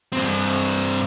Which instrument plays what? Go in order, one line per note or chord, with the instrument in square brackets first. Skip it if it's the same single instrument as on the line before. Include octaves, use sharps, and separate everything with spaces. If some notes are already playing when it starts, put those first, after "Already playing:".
[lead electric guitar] G2 C4